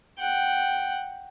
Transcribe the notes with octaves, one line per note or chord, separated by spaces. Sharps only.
F#5 G5